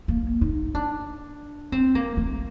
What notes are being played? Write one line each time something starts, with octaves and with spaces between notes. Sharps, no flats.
A#3
D#4
D4
C4
A#3
A3